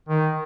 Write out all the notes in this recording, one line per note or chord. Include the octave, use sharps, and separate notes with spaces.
D#3